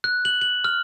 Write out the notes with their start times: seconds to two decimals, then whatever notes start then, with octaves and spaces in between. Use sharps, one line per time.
0.04 F#6
0.25 F#7
0.41 F#7
0.64 F6